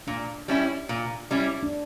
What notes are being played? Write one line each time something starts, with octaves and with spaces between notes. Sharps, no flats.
A#2 D4
G3 C#4 E4
A#2
G3 C#4 E4
D4